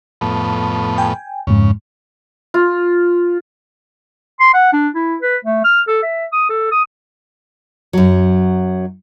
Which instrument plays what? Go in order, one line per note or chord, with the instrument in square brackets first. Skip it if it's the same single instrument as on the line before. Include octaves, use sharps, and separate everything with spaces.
[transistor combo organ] F2 A2 B3
[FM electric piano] G5 G#5
[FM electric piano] F2 G#2 [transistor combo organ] C#3
[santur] F4
[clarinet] C6
F#5
D4
E4
B4
A3
F6
A4
E5
D#6
A4
D#6
[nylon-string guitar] F#2 F#3